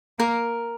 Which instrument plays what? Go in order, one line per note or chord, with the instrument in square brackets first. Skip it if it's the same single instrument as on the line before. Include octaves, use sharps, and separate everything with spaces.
[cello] A#3 [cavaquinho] A#4